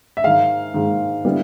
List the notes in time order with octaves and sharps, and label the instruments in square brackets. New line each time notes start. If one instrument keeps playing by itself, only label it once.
[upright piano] E5
G#2 D#3 G#3 F5
G#2 D#3 G#3
D3 G3 B3 E4